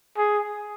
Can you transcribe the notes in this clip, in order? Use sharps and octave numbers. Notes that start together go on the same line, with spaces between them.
G#4